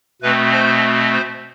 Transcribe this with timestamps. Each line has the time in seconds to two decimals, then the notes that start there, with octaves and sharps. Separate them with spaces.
0.22 B2 A3 C4 B4
0.52 C5
1.12 C5